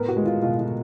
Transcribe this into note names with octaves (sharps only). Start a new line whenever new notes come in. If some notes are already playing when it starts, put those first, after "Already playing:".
Already playing: A2 B3 A#4
F#4
G#3
F4
B2 F4
F4